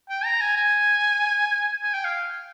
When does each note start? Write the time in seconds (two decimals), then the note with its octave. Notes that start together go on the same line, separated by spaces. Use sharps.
0.10 G5
0.25 A#5
0.41 G#5
0.57 G#5
1.84 G#5
1.94 G5
2.05 F5